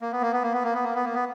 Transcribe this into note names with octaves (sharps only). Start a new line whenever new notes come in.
A#3
B3
A#3
B3
A#3
B3
A#3
B3
A#3
B3
A#3
B3